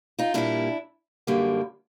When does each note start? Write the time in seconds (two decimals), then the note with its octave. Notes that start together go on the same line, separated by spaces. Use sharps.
0.19 D#4 F4
0.34 A#2 G3 A#3 D4 E4
1.27 F#2 D3 G3 A#3